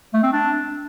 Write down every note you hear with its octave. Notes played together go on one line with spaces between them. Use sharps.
A3
C4
D4